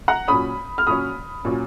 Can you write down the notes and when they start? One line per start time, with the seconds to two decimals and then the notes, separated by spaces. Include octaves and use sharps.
0.08 F#5 A#5
0.28 A#2 F#3 C#4 B5 D#6
0.78 F6
0.87 A#2 F#3 C#4 B5 D#6
1.45 A#2 F#3 C#4